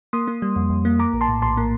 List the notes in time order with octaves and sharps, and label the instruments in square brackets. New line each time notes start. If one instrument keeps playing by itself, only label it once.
[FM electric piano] A#3 C6 D#6
A#3
G3
F2
F2
A#3
A#3 A#5 D6
A#1
A5 C6
A2
A#1 A5 C6
A#3